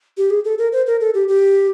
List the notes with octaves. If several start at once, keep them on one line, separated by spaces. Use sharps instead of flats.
G4
G#4
A4
A#4
C5
A#4
A4
G4
G4